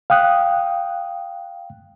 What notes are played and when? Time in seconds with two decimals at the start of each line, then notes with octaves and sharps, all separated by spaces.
0.10 F5 G5 D#6 F#6